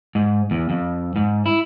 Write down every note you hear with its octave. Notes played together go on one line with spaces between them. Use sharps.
G#2
E2
F2
G#2
E4